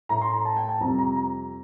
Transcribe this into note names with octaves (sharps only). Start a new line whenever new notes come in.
A2 A3 A#5
C6
A#5
A5
G5
A5
F2 C3 G3 A#5
A#5
A#5